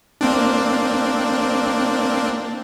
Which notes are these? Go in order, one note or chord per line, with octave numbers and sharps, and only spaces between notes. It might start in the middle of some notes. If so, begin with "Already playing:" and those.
A#3 C4 D4